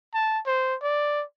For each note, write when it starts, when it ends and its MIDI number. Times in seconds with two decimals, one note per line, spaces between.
0.14 0.39 81
0.46 0.75 72
0.82 1.23 74